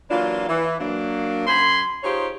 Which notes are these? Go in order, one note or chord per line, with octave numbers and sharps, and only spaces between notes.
E3 F#3 A#3 D4 F4
E3
F#3 A#3 D4
F#2 G#5 B5 C6
D#4 F4 G4 G#4 C5 C#5